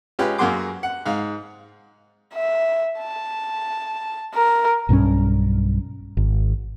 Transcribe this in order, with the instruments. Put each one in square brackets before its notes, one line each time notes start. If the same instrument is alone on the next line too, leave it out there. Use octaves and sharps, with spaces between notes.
[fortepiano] G#3 C#4 F4 G4 B4
F#2 A#3 F#4 G#4 C6 D6
F#5
G#2 F5
[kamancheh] E5
A5
A#4
[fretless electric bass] B1 G2 F3 C#4
G#1